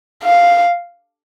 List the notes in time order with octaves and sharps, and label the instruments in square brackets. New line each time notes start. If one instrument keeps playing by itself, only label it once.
[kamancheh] F5